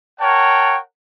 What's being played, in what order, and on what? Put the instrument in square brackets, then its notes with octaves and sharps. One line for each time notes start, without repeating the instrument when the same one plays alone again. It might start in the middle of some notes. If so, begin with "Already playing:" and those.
[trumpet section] A#4 C#5 F#5 G5 A5